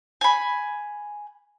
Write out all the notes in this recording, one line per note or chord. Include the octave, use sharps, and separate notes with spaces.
G#5 B5